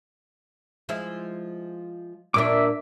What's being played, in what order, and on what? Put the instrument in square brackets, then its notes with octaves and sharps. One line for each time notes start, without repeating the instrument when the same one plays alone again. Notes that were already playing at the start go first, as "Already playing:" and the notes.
[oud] F3 G#3 E4
[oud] A#2 A#3 D4 [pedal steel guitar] E5 D6